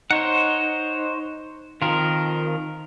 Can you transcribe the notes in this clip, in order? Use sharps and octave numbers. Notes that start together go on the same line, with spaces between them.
D#4 C5 C#5 F#5
D#3 F3 C4 F4 A#4